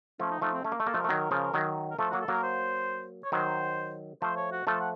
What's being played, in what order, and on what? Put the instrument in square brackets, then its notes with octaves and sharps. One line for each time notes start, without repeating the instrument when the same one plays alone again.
[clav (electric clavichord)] F3 A3 [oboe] C#4
[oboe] D#4
[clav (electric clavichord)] F3 A3 [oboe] D#4
[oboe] C4
[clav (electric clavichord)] A3 [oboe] C#4
[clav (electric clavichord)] A#3
A3
[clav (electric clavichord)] A#3 [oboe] A4
[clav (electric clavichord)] F3 A3
[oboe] A#4
[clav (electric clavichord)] A3
D#3 F#3
C#3 F3
D#3 F#3
[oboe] A#4
[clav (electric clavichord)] F3 A3 [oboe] A4
[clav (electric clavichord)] F#3 A#3 [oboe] F#4
[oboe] A4
[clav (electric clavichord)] F#3 A#3 [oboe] A#4
[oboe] C5
C#5
[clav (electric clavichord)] D#3 F#3 [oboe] C5
[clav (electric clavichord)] F3 A3 [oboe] C5
[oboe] C#5
F#4
[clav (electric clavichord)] F3 A3 [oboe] A4
[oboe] F#5